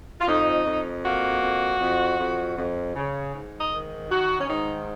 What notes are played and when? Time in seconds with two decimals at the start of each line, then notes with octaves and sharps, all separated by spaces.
0.21 F4
0.27 F2 D#4
0.66 F2
1.04 A#3 F#4
1.42 F2
1.81 F2
2.19 F2
2.57 F2
2.96 C#3
3.34 G#2
3.60 D#5
3.72 D#3
4.10 D#3 F#4
4.39 C#4
4.49 G#2 D#4